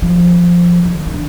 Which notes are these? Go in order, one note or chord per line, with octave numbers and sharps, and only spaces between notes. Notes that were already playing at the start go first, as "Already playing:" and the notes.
F3
D#3
D#3
D3